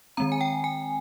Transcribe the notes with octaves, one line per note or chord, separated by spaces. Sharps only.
D#3 G#3 C4 A#5
G#5
G5
G#5